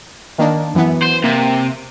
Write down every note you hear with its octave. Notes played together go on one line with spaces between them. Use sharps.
D#3 A#3 D4
F#2 E3 B3
C5
C3 A#3